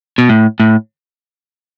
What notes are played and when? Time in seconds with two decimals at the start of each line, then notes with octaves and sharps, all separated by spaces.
0.18 B2
0.29 A2
0.60 A2